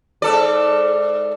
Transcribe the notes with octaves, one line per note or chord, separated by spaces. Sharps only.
G#2 A4 D5